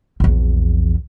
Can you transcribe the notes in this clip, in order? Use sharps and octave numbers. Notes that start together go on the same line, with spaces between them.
A#1 E2